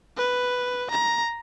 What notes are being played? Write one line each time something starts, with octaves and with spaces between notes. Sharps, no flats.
B4
A#5